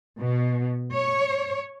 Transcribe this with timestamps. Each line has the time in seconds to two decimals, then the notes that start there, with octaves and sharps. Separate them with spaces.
0.20 B2
0.93 C#5